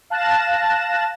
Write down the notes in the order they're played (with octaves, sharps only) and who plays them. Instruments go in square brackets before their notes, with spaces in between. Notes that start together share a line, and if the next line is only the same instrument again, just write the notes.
[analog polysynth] F5 A5 F#6 A6 A#6 E7